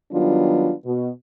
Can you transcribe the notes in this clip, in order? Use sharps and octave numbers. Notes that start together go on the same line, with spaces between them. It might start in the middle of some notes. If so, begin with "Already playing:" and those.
D#3 F#3 G3 B3 D4 F4
B2